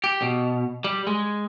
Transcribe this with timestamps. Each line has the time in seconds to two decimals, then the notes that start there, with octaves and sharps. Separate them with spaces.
0.04 G4
0.22 B2
0.84 G3
1.07 G#3